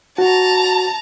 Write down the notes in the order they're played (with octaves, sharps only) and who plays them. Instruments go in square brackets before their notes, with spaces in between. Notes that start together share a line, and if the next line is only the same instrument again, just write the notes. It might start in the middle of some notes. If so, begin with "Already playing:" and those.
[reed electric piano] F#4 [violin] A5 A#5